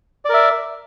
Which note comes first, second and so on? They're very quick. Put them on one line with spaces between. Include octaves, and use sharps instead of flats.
D5 A#4 E5